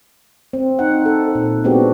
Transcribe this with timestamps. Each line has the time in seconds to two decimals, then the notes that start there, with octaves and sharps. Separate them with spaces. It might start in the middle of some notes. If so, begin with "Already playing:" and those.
0.53 C4
0.79 D#4 F#5
1.06 A4
1.35 A#2
1.64 G#3 B3 C4 D4 F#4 G4